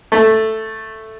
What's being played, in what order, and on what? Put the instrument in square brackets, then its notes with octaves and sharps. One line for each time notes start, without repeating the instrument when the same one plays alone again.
[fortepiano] A3